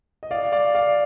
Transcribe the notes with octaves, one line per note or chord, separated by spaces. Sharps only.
D#5
D5 F5
D5 F5
D5 F5